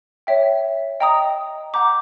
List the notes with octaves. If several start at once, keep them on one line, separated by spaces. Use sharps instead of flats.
C#5 E5 G5
D#5 G5 A#5 D#6
F#5 A#5 D6 G6